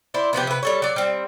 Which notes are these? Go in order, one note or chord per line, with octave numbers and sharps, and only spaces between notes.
E4 C5 D5
C3 F3 B3 G4
C3 B4
G3 A4 C#5
F#3 D5
G3 C4